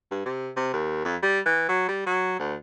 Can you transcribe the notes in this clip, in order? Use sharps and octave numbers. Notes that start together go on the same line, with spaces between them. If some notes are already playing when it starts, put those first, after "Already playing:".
G2
C3
C3
D#2
F2
G3
E3
F#3
G3
F#3
D2